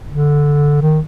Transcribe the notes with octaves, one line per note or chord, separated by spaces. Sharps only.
D3
D#3